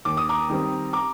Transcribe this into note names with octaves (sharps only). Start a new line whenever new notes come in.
D#2 D6
D#6
A#5 D6
D#3 G3 C4
A#5 D6